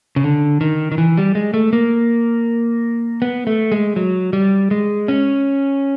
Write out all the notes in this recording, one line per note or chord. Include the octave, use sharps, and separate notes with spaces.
C#3
D3
D#3
D#3
E3
G3
G#3
A3
A#3
B3
A3
G#3
F#3
G3
G#3
C#4